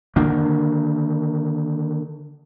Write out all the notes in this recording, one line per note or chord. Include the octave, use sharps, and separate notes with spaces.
D3 D#3 A#3